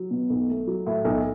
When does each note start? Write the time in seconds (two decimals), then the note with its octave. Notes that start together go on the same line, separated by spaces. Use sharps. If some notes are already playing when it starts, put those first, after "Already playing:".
Already playing: F#3
0.11 B2
0.30 B1
0.48 A3
0.67 F#3
0.87 A2
1.05 B1